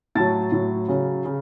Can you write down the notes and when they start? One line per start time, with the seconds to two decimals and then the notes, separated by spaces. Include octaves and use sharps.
0.15 A2 F#3 A5 A6
0.52 A2 F#3
0.88 C#3 F#3
1.25 C#3